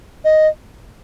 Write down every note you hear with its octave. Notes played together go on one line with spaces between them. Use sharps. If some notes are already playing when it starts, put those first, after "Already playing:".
D#5